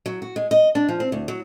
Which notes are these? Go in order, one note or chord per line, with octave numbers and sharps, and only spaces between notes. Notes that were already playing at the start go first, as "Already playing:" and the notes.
F#3
F#4
G#3
D#5
D4
F3
C4
D2
F#3